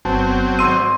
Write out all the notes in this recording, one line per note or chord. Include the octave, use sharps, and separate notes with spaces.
G1 F#3 B3 C4 A5
G#1 C6 E6 D#7